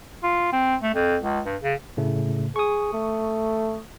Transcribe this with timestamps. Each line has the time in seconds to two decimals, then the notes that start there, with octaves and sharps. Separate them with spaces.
0.23 F4
0.52 C4
0.82 A3
0.94 F2
1.21 C#2
1.45 G2
1.62 C#3
1.97 A2 C#3 A3
2.56 G#4 C#6 D#6
2.93 A3